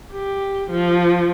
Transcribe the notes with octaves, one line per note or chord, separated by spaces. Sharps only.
G4
F3